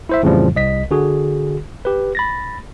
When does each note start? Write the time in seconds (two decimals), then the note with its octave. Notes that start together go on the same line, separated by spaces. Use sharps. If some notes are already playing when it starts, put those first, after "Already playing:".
0.09 E4 C5 E5
0.23 F2 A2 C#3 E3 F3 G3
0.56 C2 D#5 B6
0.91 D3 F#4 G#4
1.85 G4 B4
2.15 B5 A6 A#6